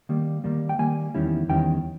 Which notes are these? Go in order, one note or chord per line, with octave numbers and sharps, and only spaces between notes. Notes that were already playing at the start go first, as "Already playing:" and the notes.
D#3 G3 A#3
D#3 G3 A#3
G5
D#3 G3 A#3 G#5
E2 D#3 G3 C#4 E4
E2 D#3 G3 C#4 E4 G5